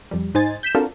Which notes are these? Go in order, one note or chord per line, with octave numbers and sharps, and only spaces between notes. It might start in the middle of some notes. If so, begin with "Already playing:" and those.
F2 G3
G#2 D#4 C5 G#5 A6
G6 B6 E7
C4 D4 F4 F#4 A4 A#4